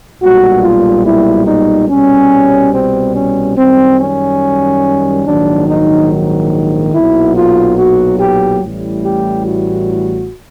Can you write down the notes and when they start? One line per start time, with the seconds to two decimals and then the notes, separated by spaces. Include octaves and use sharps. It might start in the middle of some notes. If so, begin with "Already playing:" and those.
0.21 B1 A#2 G3 F#4
0.63 F4
1.05 E4
1.47 D#4
1.89 C2 B2 G3 C#4
2.73 C4
3.16 C#4
3.57 F#2 D#3 G3 C4
3.99 C#4
5.25 A#1 G#2 D#3 F#3 D4
5.68 D#4
6.93 B1 A#2 F#3 E4
7.35 F4
7.78 F#4
8.20 G4
8.62 A1 A2 E3 G3
9.04 G4
9.46 F#4